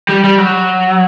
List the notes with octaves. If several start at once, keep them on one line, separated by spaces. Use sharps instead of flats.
G3
G3
F#3